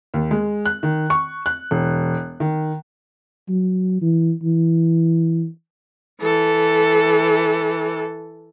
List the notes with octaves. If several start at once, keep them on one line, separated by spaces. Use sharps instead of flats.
D#2
G#3
F#6
D#3
C#6
F#6
E1
D#3
F#3
E3
E3
E3 A4